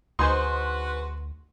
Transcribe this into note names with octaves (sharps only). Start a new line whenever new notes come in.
D2 D#4 F#4 G#4 B4 C5 C6